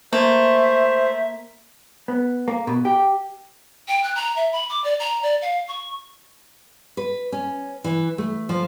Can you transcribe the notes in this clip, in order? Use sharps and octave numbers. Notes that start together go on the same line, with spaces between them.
A3 A#3 C5 E5
B3
A#3
B2
G4
G5
F#6
A#5
E5
B5
D6
D5
A#5
D5
F5
C#6
B4
C#4
E3
A3
F3